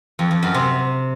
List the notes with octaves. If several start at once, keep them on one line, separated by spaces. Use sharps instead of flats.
F2
F2
F#2
C3